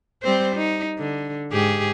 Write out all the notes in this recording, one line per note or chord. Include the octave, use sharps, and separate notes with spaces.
G3 C4 C5
D#4
D3
G#2 G4 G#4